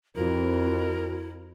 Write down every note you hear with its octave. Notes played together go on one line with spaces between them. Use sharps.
F2 E4 F#4 A#4